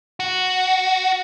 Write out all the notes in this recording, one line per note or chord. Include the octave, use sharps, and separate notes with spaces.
F#4